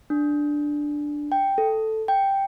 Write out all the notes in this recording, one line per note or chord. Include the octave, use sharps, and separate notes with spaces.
D4
G5
A4
G5